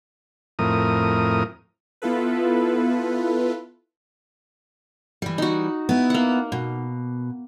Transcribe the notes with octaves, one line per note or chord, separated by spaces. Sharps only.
F2 A2 A#4 D#6
B3 E4 F4 A4 B4
E3 G3
D#4 F#4
B3 E4
A#3 F#5
B2